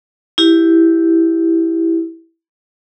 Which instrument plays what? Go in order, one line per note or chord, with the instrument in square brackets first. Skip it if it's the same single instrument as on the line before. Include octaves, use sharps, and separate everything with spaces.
[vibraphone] E4 G4